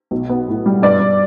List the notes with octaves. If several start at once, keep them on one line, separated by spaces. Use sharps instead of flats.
B1
B3
A2
G3
G2 D5
G2